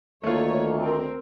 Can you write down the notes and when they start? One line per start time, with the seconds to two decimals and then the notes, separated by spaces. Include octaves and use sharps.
0.23 D2 D#3 A3 A#3 F4 C#5
0.79 C4 A#4